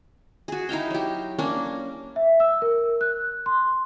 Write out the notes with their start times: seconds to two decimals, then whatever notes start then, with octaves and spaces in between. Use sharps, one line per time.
0.48 F#4 G#4
0.69 D#4 E4 F5 G5
0.91 F#3 G4
1.39 A#3 C#4 D4
2.16 E5
2.40 E6
2.62 A#4
3.01 F#6
3.46 C6